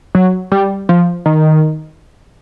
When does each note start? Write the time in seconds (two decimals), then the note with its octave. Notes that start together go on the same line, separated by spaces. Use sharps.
0.15 F#3
0.52 G3
0.89 F3
1.26 D#3